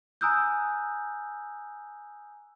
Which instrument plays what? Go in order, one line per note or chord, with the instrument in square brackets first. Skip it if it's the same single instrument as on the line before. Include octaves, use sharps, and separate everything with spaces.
[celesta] G#5 A#5 D#6 E6 F#6 G6